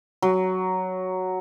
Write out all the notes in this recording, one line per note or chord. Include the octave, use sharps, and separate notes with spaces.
F#3